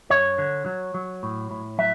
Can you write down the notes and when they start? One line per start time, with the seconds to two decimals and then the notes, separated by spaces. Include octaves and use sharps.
0.10 F#2 C#5
0.38 D3
0.66 F#3
0.94 F#3
1.23 A2
1.51 A2
1.78 F#3 E5